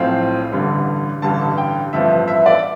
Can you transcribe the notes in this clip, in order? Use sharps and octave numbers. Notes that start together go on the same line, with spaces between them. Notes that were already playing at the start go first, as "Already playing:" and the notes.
Already playing: B1 A2 F3 C4 F5
A1 G2 D3 G3
A1 G2 D3 G3 A5
G5
A1 G2 F3 B3 E5
E5
D5